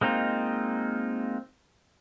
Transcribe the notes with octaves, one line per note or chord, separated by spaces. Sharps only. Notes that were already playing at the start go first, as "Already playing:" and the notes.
G#3 A#3 C4 D#4 F4